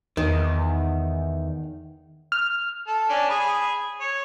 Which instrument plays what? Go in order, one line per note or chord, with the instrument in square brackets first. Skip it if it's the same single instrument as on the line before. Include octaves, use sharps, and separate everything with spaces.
[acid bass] E2 [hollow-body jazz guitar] D#3
[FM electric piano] F6
[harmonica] A4
C#4 D4
G#4 B5
C#5